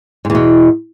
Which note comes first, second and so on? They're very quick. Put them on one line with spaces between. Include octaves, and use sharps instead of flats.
G#2 E2 B2